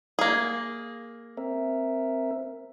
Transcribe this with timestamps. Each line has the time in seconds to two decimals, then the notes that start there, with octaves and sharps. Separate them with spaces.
0.19 A#3 G#4
1.37 C4 A#4 E5